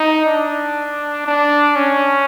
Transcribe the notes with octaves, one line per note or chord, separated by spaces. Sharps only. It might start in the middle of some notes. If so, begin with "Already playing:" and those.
Already playing: D#4
D4
D4
C#4